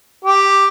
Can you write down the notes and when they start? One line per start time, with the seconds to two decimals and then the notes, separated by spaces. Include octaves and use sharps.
0.25 G4